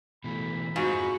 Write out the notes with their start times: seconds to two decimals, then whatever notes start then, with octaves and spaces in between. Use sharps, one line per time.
0.24 B2 E3 A3 B5
0.76 G#2 C4 F4 F#4